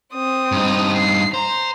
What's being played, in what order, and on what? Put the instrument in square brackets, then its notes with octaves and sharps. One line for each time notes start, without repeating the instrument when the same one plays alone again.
[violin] C4 D#6
[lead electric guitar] G2 D#4
[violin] C7
[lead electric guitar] C5 [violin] A#5